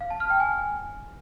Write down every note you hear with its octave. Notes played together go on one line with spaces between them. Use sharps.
F5
A5
F6
G5
G#5